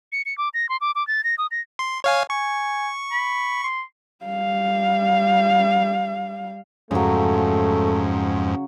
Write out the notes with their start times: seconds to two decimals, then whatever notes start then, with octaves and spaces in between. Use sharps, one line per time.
0.12 C#7
0.26 C#7
0.38 D6
0.54 A#6
0.69 C6
0.81 D6
0.95 D6
1.07 A6
1.24 A#6
1.38 D#6
1.51 A#6
1.79 C6
2.04 C#5 F5 G#5
2.30 G#5 C#6
3.11 B5
3.64 C6
4.25 G3 F5
6.91 F2 G#2 C#3 F#3 A3